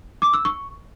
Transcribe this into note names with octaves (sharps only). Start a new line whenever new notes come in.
D6
E6
C#6